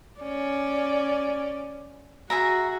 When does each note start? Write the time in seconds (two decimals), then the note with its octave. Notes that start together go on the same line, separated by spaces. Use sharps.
0.21 C#4 D5
2.30 F#4 G#4 E5 A#5